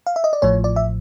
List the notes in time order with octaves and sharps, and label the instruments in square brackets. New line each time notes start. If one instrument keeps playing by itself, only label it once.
[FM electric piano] F5
E5
D#5
D5
A1 A2 F3 C#5
D5
E5